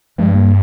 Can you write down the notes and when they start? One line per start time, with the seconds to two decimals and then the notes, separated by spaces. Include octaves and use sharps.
0.18 G2 F3 G#3
0.35 G3 A#3